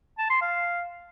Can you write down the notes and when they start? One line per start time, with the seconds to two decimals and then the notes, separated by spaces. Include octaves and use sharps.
0.18 A5
0.30 C6
0.42 F5